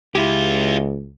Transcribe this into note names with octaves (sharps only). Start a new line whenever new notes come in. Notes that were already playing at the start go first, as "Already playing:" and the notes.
C#2 G#3 E4 F4 G4